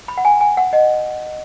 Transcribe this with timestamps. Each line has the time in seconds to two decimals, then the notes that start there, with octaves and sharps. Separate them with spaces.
0.08 B5
0.17 F#5
0.25 G#5
0.41 G#5
0.57 F#5
0.73 D#5